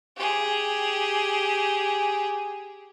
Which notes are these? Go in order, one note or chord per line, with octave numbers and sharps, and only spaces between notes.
G4 G#4